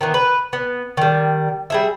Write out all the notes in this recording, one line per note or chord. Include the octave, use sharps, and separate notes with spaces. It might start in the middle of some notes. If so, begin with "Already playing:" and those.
D#3 E3 B3
B4
B3
D#3 G3
G3 G#4 E5